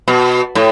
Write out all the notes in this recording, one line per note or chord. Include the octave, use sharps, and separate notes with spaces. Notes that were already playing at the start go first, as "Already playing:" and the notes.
B2
A2